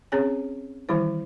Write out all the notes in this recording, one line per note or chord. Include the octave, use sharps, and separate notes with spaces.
C4 C#4 G#4 C#5 G#5
D#3 E3 G3 E4 C5